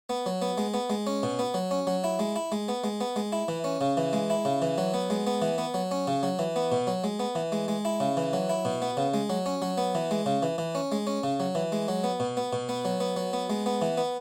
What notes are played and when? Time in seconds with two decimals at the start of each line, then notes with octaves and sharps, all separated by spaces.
0.09 B3
0.26 F#3
0.42 B3
0.58 G#3
0.74 B3
0.90 G#3
1.07 C#4
1.23 B2
1.39 B3
1.54 F#3
1.71 C#4
1.87 F#3
2.04 E4
2.19 G#3
2.36 E4
2.52 G#3
2.68 B3
2.84 G#3
3.01 B3
3.16 G#3
3.32 E4
3.48 E3
3.64 C#4
3.81 C#3
3.97 E3
4.13 G#3
4.30 E4
4.45 C#3
4.62 E3
4.78 F#3
4.94 B3
5.10 G#3
5.27 B3
5.42 E3
5.58 B3
5.74 F#3
5.91 C#4
6.07 C#3
6.23 F#3
6.39 E3
6.56 B3
6.72 B2
6.87 F#3
7.04 G#3
7.19 B3
7.35 E3
7.52 G#3
7.68 G#3
7.85 E4
8.00 C#3
8.17 E3
8.33 F#3
8.49 E4
8.65 B2
8.82 B3
8.97 C#3
9.14 G#3
9.30 F#3
9.46 C#4
9.62 F#3
9.78 B3
9.95 E3
10.11 G#3
10.26 C#3
10.43 E3
10.58 E3
10.75 C#4
10.92 G#3
11.07 C#4
11.23 C#3
11.40 F#3
11.55 E3
11.72 G#3
11.88 F#3
12.04 B3
12.20 B2
12.37 B3
12.53 B2
12.69 B3
12.85 F#3
13.00 B3
13.16 F#3
13.33 B3
13.50 G#3
13.66 B3
13.82 E3
13.97 B3